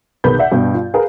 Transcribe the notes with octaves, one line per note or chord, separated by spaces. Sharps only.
B1 D#3 G#4 B4 B5 G6
D5 E5 F#5
G2 B2
F4
G#4 A#4 B4 F5